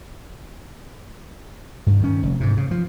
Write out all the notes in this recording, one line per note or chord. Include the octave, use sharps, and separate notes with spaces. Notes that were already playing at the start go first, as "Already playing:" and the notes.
G2
D#3 C#4
F1
G#2 C3
C#3
F3